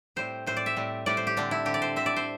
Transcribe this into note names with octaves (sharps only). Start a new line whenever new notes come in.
A2 G3 C4 C5
A2 G3 C4 C5
D5
E5
A2 G3 C4
A2 G3 C4 D5
C5
G4
D3 C4 D4
E4
D3 C4 G4
D5
C5
D3 C4 E5
D5
C5